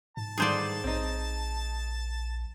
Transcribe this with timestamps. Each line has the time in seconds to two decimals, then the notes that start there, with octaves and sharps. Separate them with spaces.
0.17 G#2 A5
0.38 G2 D3 D#3 G#4 C5 D5
0.84 A#1 C4 D#4